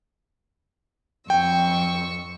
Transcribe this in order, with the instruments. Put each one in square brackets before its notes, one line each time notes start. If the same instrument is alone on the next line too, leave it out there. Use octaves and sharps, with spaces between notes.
[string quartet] F2 C#6 E6 [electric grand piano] G5